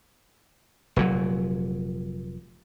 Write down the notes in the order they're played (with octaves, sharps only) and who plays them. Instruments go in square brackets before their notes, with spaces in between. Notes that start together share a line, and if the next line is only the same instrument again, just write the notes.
[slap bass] F1 A#2 F#3